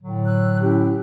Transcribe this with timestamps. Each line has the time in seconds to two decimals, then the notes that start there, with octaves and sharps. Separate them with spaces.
0.02 A2 D3 F#3
0.26 E6 F#6
0.62 C#4 E4 G4